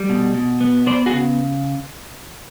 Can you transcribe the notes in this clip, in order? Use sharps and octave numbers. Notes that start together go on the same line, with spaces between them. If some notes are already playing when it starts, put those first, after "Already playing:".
Already playing: G3
B2
B2
B3
B3 C5 D5
F#4 G#4
C#3